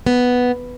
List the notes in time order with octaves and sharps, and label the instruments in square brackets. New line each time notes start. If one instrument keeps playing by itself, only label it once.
[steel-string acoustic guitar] B3